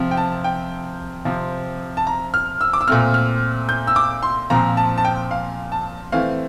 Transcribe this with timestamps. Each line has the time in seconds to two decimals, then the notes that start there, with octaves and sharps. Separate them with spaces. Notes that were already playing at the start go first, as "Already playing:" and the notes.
Already playing: C3 F3 C4
0.11 G5
0.17 A5
0.44 G5
1.25 C3 F3 C4
1.97 A5
2.07 A#5
2.34 F6
2.61 E6
2.73 D6
2.81 E6
2.87 A#2 A3 C4 F6
3.14 F6
3.69 G6
3.87 E6
3.96 D6
4.23 C6
4.50 A#2 F3 C4 A#5
4.77 A5
4.98 A5
5.05 G5
5.31 F5
5.72 A5
6.12 E3 A3 C4 F5